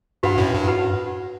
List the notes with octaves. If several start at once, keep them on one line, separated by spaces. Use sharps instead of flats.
G2 F#4 B4 F#5 B5
F#2 A2
G2
F#4 B4 F#5 B5